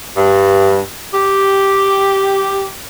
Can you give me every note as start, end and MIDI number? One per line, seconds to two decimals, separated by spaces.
0.17 0.81 43
1.14 2.70 67